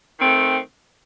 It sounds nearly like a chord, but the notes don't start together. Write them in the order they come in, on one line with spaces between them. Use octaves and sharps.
D#3 C4 A3